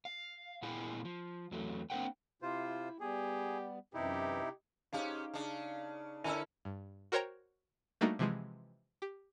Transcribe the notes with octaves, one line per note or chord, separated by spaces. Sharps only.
F5
A#2 B3 E4 G#4 F5 G#5
F3
E2 F#3 A3
A#3 C4 D4 A#4 F#5 G5
C3 E4 F4 C5
G3 B3 G4 G#4
F#2 C3 E3 D#4 E4 G4
G#2 C#4 D#4 G4 F5
C#3 D4
D3 C#4 E4 A4 A#4 G#5 E6
G2
F#4 A#4 C5 C#5 G5 A#5
G3 A3 A#3 D4 D#4 F#4
C3 E3 F3 G#3
G4